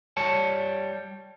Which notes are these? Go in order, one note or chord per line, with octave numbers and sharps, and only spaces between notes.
G3 C#5 A5